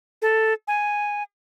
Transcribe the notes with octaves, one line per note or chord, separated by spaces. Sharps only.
A4
G#5